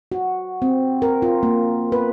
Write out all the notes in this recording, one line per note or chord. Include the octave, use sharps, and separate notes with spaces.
F#4
C4
A#4
F4
A#3
B4